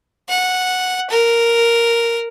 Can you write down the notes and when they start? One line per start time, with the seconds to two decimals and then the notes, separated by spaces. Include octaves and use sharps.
0.29 F#5
1.10 A#4